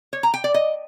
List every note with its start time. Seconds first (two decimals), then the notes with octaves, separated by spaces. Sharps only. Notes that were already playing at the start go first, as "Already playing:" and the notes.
0.13 C#5
0.23 A#5
0.34 G5
0.44 D5
0.54 D#5